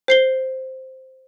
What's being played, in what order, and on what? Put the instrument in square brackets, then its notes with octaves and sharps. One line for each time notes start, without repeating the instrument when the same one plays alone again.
[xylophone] C5 C7 G7